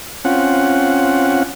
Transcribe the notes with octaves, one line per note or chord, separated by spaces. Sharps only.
C4 C#4 F4 F#5